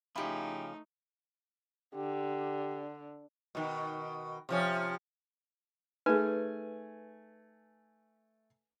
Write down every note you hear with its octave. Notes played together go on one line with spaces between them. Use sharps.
C#3 F3 A3 D#4 E4 G4
D3 G4
B2 D#3
C3 F3 C#4
A3 D#4 G#4 B4 G#5